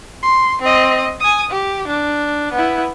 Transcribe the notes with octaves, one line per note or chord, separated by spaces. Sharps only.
C6
C4 D#5
G#5 D#6
G4
D4
B3 E4